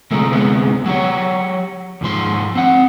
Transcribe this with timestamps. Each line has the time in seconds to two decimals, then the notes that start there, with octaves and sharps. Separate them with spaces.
0.11 D2 C3 F3 G#3 A3 A#4
0.31 D2 C3 G#3 B3
0.86 F#3 G4 C#5
2.01 D#2 G#2 F3 C6
2.55 C4 F#5